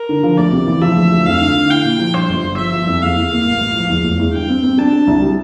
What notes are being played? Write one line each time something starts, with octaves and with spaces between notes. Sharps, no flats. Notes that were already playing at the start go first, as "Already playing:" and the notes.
Already playing: A#4
D3
F3
D2 D5
C3
E3
F3 E5
D2
D2
F2 F5
D3
D3
E4 G5
A#2
F3
G2 C5
G1
G1
F3 E5
F3
F2
E2 F5
E2
A#3
A1
A1
F3
E2
F1
E2
G2 G5
C4
C4
D4 A5
D4
C2
G3